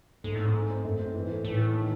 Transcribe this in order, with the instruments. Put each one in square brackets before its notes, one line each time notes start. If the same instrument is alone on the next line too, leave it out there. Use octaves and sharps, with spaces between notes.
[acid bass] G#2 [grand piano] A3
[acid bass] A2 [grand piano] C4
[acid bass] G#2
[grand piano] A3
C4
[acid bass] F#2 [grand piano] A3
[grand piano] C4
[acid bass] G#2 [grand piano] E3
[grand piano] A3
[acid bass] A2 [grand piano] E3
[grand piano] A3
D#3